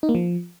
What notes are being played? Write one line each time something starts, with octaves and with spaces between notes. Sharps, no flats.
D#4
A#3
F3